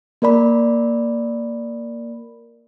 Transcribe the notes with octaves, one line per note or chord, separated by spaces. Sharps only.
A#3 A#4 D5 B5